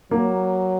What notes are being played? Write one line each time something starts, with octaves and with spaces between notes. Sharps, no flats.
F#3 A#3